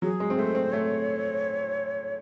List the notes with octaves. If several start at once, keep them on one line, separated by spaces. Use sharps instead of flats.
F#3 G#4
G#3
C4
A3 C5
C4
A3 C#5